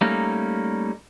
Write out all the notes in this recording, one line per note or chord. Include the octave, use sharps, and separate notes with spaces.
G3 A3 A#3 C#4 D#4